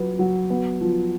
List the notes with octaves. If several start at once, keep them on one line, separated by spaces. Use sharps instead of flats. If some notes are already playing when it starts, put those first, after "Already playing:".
Already playing: F#3 F4 B4
F#3
B3
F3